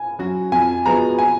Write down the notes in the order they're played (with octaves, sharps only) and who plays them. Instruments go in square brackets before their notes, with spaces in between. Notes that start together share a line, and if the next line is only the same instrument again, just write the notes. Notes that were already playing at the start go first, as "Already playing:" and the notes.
Already playing: [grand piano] G#5
[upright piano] F#3 C#4 F#4
[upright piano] F2 [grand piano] G#5
[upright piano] F3 G#3 B3 F#4 [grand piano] A#5
[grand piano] G#5